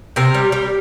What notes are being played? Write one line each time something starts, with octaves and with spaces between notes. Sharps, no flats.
C3 A#4
G3
G3